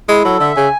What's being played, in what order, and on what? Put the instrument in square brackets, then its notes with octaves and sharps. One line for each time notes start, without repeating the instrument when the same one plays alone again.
[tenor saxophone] G#3 [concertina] E4
[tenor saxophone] F#3 [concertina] A4
[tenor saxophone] D3 [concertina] E5
[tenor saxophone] C#3 [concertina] G#5